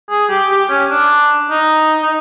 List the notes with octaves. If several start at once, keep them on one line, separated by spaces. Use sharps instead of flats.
G#4
G4
G4
C#4
D4
D#4
D#4